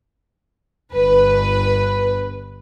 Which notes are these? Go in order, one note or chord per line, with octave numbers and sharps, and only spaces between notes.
G1 B4